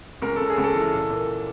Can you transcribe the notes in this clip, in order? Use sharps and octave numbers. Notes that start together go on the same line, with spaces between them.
C#2 A#4
C#3 A4
G#4
C#2
A4
E3
A#2
A#2